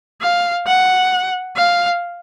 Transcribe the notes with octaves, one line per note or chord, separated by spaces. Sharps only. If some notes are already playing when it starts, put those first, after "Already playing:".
F5
F#5
F5